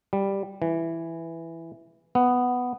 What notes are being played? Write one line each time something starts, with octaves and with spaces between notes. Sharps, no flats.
G3
E3
B3